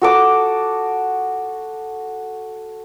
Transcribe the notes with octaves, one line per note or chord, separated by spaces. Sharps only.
F#4 A4 D6 D#6